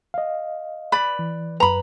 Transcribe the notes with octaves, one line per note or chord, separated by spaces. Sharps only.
D#5 F5
B4 D5 B5
E3
F#2 B4 A#5 B5